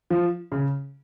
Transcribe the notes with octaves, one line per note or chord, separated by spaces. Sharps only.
F3
C#3